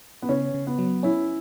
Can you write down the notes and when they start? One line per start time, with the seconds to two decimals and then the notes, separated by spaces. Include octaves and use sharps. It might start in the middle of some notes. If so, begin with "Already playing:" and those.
0.22 B3
0.29 C#3 C#4
0.54 C#3
0.67 B3
0.79 F#3
1.03 C#4 E4